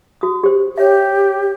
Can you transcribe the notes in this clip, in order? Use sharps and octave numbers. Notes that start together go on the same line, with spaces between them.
F#4 D#6
G4 C5
G4 C#5 E5